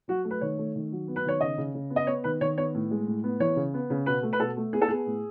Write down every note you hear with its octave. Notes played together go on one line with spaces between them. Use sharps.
F#3 F#4
A3
B4
D#3 C#5
A3
D#3
F#3
B3
B4
D#3 C#5
C#3 D#5
C#3
C#3
B3
D#5
B3 C#5
D#3 B4
D#3 C#5
B3 C#5
A2
G#3
A2
B3
E3 C#5
C#3
B3
C#3
B2 B4
A3
B4
B2 A4
A3
B3 G#4
A4
B3 G#4
A2